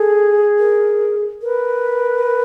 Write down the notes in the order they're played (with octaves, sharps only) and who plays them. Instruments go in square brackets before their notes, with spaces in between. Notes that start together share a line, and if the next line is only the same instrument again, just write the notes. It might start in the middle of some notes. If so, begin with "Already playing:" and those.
Already playing: [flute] G#4 [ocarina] A4
[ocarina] A#4
[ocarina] A#4 [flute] B4